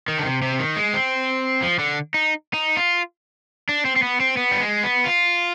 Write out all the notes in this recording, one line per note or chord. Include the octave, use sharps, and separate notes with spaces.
D#3
D3
C3
C3
D#3
G#3
C4
F3
D3
D#4
D#4
F4
D4
C4
C4
B3
C4
B3
G3
G#3
B3
F4